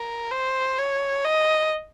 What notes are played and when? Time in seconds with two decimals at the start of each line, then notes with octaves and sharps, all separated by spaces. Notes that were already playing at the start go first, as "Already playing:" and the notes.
Already playing: A#4
0.31 C5
0.78 C#5
1.25 D#5